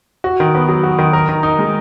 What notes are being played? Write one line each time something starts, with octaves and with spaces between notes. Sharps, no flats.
F#4
D#3
B3
F#3
F#4
D#3
A#4
D#3
D#4
G#3